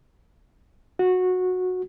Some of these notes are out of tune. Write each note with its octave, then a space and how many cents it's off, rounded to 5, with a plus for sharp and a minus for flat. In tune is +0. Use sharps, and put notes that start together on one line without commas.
F#4 -15